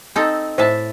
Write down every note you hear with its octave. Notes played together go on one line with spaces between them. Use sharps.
C4 D#4 A4
A2 C5 E5 A5